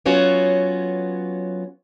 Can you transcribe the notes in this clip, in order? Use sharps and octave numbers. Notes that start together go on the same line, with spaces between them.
F#3 B3 C#4 F4 F#4 C#5